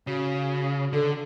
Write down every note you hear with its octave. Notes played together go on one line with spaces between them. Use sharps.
C#3 F#4
D3 A4